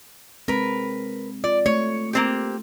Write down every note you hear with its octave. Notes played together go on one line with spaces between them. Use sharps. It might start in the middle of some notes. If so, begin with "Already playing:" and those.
G#3 C4 A#4 B4
F4 D5
A3 C#5
A#3 C4 G4